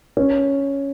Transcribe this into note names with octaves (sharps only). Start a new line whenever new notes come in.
C#4